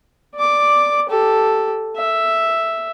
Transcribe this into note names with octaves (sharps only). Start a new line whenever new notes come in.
D5 D6
G4 A4
E5